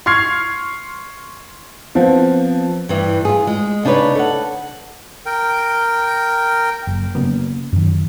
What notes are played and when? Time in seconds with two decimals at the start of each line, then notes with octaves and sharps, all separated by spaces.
0.06 C6 C#6 F6 G#6 C7
1.95 F3 B3 C4
2.89 G2 E3
3.25 F4 G#4
3.47 G#3
3.85 C#3 D4 D#4 G#4 B4 C#5
4.15 A4 F#5
5.26 A#4 G5
6.87 F#1
7.15 C#3 F#3 A#3 B3
7.73 F#2 D#3